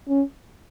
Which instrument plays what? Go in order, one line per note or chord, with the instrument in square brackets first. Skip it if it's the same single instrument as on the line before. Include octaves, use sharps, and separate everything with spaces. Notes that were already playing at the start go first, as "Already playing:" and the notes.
[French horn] C#4